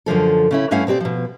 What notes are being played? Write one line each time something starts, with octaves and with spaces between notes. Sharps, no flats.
F#2 D3 F3 A4
C#3 C#4 E4
G2 A3 C#4 E4 F5 F#5
B2 C4 G4 D5
B2 F3